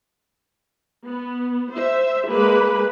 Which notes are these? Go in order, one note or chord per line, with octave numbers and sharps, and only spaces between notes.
B3
C5 E5
G#3 A#3 B4